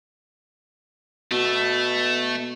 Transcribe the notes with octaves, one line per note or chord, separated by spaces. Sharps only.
B2 A3